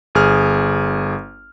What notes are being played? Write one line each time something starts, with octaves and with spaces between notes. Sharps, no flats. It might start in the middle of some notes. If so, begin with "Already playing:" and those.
G1 G#4 F6